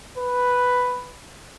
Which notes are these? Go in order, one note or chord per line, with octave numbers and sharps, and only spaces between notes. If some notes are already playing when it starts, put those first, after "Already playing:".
B4